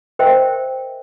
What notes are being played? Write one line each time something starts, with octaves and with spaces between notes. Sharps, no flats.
A#4 C5 D#5 E5 G5